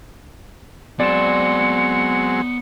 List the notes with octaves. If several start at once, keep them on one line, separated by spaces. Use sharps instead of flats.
F#3 G#3 B3 C4 C5 D5 C#7 E7